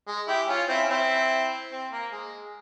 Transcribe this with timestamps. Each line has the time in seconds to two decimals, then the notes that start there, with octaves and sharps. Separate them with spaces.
0.07 G#3
0.28 E4 G4
0.48 C#4 F4
0.69 C4 E4
0.84 C#4
0.90 C4 E4
1.71 C4
1.92 A#3
2.12 G#3